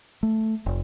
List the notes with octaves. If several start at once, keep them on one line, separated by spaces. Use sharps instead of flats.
A3
F1